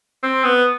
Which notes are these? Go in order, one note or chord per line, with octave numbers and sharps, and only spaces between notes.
C4
B3